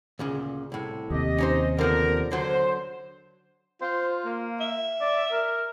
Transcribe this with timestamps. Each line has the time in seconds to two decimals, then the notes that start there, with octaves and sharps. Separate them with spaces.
0.19 D2 A#2 C#3
0.72 C2 A2
1.10 D#2 C3 G4 D#5
1.38 C#4 D#4 C5
1.78 D3 F3 B3 A#4
2.32 D3 F#3 C5
3.82 F4 C5
4.25 A#3
4.60 E5
5.01 D5
5.32 A#4